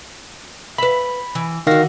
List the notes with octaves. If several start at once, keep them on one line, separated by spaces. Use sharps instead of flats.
B4 E5 B5
E3
D3 D#3 F#4 F5 A#6